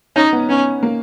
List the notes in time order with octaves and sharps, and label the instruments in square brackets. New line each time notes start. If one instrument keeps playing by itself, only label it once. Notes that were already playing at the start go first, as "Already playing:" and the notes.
[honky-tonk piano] C#4 [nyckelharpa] D#4
[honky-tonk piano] B3
[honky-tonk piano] B3 [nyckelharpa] C#4
[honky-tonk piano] A#3